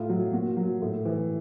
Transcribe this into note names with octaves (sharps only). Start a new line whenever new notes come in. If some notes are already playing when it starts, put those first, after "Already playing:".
Already playing: A2 F4
F#3
A#2 F#4
F#3
A2
E3